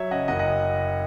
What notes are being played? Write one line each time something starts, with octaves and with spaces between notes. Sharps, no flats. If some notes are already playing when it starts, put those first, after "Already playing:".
Already playing: F#3 C#5 E5
C#3 D#5 F#5
F#1 D#5 F#5
D#5 F#5